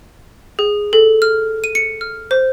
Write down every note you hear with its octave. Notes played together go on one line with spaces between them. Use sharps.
G#4
A4
F6
D#7
C#7
F6
C5